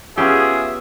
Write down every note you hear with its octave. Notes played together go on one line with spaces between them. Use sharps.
B3 C#4 F4 G4 G#4 E5